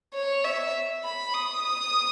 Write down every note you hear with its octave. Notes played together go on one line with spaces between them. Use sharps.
C#5
E5
B5
D#6
D#6